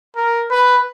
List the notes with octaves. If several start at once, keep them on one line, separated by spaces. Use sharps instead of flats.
A#4
B4